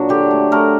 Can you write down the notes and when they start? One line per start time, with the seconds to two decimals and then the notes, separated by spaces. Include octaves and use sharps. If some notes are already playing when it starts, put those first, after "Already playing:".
Already playing: A#2 F#3 D4
0.09 D3 G4
0.31 A3
0.52 A3 A#4